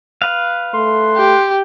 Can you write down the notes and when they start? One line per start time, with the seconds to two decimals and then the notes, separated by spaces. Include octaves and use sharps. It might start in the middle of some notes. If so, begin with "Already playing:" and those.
0.22 B4 F5
0.74 A3 C6
1.16 G4